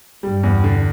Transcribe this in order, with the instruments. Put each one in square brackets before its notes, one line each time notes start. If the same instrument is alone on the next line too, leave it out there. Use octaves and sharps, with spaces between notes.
[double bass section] G2 [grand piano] G3
[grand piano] E2
D3